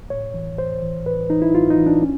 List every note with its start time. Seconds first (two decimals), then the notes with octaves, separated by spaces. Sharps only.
0.10 A2 C#5
0.34 E3
0.58 A2 C5
0.82 E3
1.06 A2 B4
1.30 E3 D#4
1.42 E4
1.54 A2 F4
1.70 D#4
1.78 E3
1.86 D4
2.02 C#4